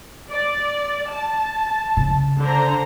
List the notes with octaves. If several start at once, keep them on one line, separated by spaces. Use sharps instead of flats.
D5
A5
C#3
D3 C5 A#5